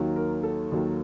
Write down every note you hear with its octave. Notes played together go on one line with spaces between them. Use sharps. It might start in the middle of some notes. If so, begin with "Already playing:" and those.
Already playing: D#2 D#3 F#3 A#3
A#4
A4
D#2 D#3 F#3 A#3